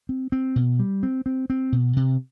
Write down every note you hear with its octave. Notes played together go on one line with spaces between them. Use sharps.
C4
C4
B2
G3
C4
C4
C4
B2
C3